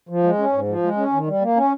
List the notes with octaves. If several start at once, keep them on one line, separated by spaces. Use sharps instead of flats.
F3
G#3
C#4
G#2
F3
G#3
C#4
D#3
G3
A#3
C#4